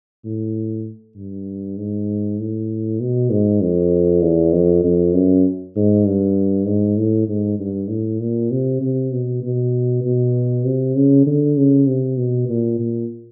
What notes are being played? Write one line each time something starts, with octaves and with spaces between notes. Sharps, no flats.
A2
G2
G#2
A2
B2
G#2
F2
E2
F2
F2
F#2
G#2
G2
G#2
A2
G#2
G2
A2
A#2
C3
C3
B2
B2
B2
C3
C#3
D3
C#3
C3
B2
A#2
A#2